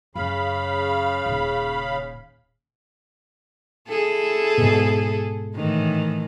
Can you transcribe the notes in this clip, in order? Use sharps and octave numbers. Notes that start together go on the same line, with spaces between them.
F#2 C#3 F5 B5
D#1
E4 G#4 A4
G#2 B2
A2 D#3 E3